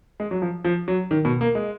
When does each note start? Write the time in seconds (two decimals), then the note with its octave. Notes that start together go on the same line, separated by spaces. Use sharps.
0.20 G#3
0.31 F#3
0.42 F3
0.64 F3
0.88 F#3
1.11 D#3
1.25 B2
1.41 A#3
1.55 G#3